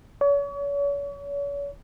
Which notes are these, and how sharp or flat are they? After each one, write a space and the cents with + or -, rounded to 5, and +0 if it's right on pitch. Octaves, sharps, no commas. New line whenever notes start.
C#5 +40